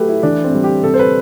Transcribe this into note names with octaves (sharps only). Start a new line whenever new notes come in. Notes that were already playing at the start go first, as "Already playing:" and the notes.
Already playing: F#3 A3 G4 A4 B4
E4
E3 D4
C4
G3
G4
C3 A4
C5
B4